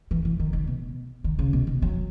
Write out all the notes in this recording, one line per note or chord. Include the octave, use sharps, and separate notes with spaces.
E3
E3
D#3
D#3
B2
D#3
C#3
B2
D#3
F#3